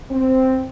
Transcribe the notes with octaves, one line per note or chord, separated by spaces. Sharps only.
C4